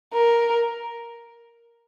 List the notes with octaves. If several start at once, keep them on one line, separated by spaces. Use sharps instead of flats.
A#4